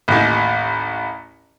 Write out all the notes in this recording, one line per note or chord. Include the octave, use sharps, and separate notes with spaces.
A1 D#2